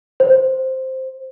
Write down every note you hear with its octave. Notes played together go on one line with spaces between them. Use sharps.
C5